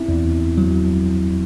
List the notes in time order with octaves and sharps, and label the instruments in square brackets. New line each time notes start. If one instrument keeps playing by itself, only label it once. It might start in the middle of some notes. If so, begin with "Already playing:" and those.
Already playing: [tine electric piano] C4 E4
E2
E2
E2
F#3